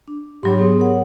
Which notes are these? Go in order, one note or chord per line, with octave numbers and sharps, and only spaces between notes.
D4
G#2 F#3 G4 C#5 B5 C6
B3 G#4
A#4 C#5 F#5